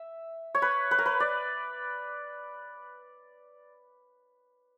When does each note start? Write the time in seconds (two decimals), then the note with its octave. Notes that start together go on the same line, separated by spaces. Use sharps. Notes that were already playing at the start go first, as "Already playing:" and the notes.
Already playing: E5
0.55 C#5
0.62 B4
0.91 B4
0.98 A#4
1.06 B4
1.20 D5